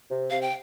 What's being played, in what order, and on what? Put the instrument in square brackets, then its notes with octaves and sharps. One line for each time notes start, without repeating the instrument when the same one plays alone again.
[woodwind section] C3
[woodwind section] C3 [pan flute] F5
[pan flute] G5